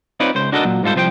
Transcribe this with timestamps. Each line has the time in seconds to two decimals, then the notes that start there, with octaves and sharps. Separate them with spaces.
0.20 C4 D#4 F4 B4 C#5 D5
0.35 C#2 C#3 C5
0.52 D4 F#4 A4 A#4 C#5 D#5
0.65 A#2 F#3
0.83 G#2 G3 F4 A4 C5
0.96 C2 F3 C5 F5 G5